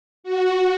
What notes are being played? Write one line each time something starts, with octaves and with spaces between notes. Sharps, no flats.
F#4